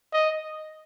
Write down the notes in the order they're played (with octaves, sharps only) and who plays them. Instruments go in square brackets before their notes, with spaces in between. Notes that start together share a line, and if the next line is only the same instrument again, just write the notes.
[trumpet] D#5